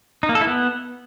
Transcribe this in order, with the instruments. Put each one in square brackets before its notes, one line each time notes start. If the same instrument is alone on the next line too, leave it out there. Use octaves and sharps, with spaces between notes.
[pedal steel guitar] D#4
A#3
A4
E4
B3